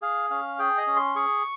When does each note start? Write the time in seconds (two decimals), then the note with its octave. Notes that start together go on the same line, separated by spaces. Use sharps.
0.02 G#4 F5
0.30 C#4 F5
0.59 G#4 G5
0.78 D#5
0.87 C#4
0.96 C6
1.16 G#4 C#6